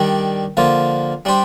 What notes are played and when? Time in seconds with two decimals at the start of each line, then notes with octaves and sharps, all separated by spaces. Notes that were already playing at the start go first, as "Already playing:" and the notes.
Already playing: D#3 G3 D4
0.57 D3 F3 A#3 F4
1.25 G3 D4 G4 C5